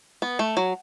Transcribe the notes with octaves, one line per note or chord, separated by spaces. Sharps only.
B3
A3
F#3